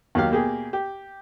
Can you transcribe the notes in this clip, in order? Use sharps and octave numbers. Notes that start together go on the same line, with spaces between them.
D#2 F#3 G4 F5
B2 A#3 G4 G#4
G4